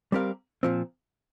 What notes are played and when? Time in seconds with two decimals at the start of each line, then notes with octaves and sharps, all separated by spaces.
0.12 G3 C4 G4 A#4 F5
0.63 A#2 F3 C4